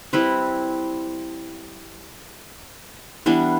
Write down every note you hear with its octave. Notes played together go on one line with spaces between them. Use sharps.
G3 C4 E4 B4
E3 G3 B3 D4